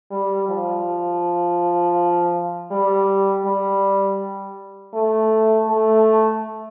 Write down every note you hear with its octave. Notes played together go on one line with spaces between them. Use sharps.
G3
F3
G3
G3
A3
A3